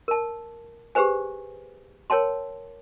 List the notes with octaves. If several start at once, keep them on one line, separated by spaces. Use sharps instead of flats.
A#4 A5
G4 G#4 B4 C5 G#5
A#4 C#5 G5 A5 C6